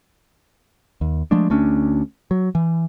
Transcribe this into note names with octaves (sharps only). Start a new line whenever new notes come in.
D#2
F3 G#3 A3 D4
D2 A3 C#4 D4
F#3
E3